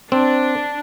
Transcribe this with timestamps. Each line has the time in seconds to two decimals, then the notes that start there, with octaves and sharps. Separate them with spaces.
0.12 C4 D4